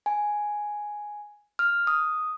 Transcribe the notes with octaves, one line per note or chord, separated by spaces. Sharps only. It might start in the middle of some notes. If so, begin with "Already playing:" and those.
G#5
F6
D#6